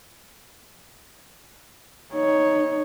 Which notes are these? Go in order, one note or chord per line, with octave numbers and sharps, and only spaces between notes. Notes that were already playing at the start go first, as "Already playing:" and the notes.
D#4 C#5